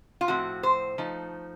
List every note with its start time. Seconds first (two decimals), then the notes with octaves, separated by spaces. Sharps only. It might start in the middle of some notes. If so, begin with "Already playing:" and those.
0.21 F4
0.28 A2 F3 C4 F#4
0.63 C5
0.98 F3 A3 D#4